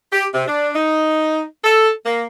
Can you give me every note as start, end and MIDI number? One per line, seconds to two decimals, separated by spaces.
0.12 0.27 67
0.34 0.46 48
0.48 0.70 62
0.75 1.43 63
1.64 1.90 69
2.06 2.24 58